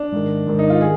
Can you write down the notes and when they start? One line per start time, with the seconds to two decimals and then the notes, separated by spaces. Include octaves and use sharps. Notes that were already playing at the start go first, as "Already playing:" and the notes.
Already playing: D4
0.12 G#2 D#3
0.47 G#2 D#3
0.59 D#4
0.70 F4
0.81 D#3 G#4